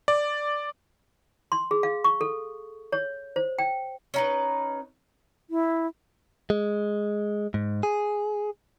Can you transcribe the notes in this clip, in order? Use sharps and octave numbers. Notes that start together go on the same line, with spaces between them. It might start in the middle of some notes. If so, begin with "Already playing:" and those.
D5
C6
G#4
F5
C#6
A4
C#5
C5
G5
C#4 D#4 B4
E4
G#3
G#2
G#4